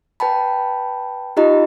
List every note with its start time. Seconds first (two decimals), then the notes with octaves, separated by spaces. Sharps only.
0.20 B4 G5 A5 B5
1.37 D#4 F4 G4 D#5 A#5